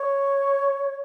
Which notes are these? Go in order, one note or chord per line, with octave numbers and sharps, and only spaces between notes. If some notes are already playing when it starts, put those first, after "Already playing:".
Already playing: C#5